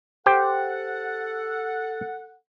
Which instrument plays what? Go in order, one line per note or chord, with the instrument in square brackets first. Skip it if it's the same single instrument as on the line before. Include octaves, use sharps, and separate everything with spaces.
[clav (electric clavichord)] G4 C5 G5 [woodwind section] A4 F#5